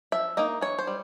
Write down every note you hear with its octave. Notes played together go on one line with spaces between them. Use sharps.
F3 E5
A#3 D#4 D#5
E3 C#5
C5
G3